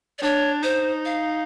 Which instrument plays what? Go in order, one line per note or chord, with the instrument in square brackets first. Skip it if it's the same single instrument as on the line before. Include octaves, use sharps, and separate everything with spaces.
[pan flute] D5
[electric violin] D4 [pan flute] C#5
[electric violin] D#4 [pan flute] C5
[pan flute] F5